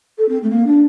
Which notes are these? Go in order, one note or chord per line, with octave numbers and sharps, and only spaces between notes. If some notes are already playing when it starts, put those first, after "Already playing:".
A4
C4
A3
A#3
D4